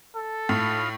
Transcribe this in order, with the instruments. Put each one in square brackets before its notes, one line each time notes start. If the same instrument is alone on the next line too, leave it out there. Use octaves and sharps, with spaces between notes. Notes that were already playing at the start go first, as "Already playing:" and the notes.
[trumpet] A4
[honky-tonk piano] A2 [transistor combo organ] D#4 F4 F5